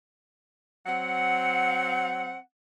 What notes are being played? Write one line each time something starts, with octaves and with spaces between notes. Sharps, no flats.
F#3 C4 F#5